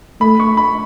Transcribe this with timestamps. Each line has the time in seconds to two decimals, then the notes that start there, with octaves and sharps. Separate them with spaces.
0.21 A3 B5
0.40 C#6
0.57 B5